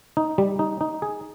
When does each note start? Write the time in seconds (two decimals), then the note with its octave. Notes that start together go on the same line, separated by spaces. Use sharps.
0.17 D#4
0.38 G3
0.59 D#4
0.81 D#4
1.02 G#4